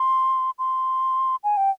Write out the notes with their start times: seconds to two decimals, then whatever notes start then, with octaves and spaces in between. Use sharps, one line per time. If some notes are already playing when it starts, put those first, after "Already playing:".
Already playing: C6
0.59 C6
1.44 G#5
1.57 G5